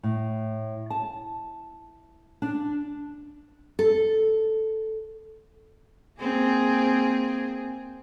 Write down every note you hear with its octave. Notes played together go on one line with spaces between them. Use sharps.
A2
A5
D4
A4
A#3 C4 G#4